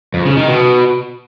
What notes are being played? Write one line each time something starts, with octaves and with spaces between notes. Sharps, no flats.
F2
C#3
D#3
B2